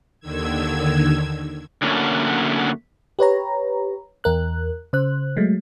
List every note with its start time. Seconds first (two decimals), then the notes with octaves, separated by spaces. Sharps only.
0.20 D#2 D3 D#3 E6 G#6
1.82 D3 F#3 A3 A#3 C#4
3.19 G4 B4 C#5 A#5
4.24 E2 A#4 F#6
4.93 C#3 C5 F#6
5.37 F#3 G#3 A3